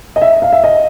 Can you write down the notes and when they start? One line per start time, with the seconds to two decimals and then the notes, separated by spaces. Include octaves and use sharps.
0.16 D#5
0.22 E5
0.42 F5
0.52 E5
0.64 D#5